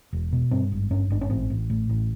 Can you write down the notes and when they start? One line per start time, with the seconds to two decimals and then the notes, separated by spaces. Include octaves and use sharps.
0.13 E1
0.32 B2
0.51 G2 C4
0.72 G#1
0.91 G2 C#4
1.10 G#1 D4
1.21 C#4
1.30 A1 C4
1.50 A1
1.70 A2
1.90 A1